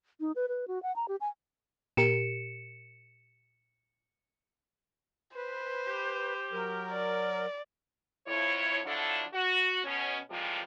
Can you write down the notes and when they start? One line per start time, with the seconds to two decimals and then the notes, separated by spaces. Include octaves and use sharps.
0.20 D#4
0.36 B4
0.48 B4
0.68 F#4
0.83 F#5
0.96 A#5
1.08 G4
1.21 G#5
1.97 A#2 G4 A#4 C#7 D7 E7
5.36 B4 C5
5.87 G4
6.52 F#3 A#4
6.91 D5
8.27 F2 E4 C#5
8.85 D3 F3 F#3 D4 E4 A4
9.34 F#4
9.85 B2 C#4
10.31 A2 C3 E3 F3 G3 G#3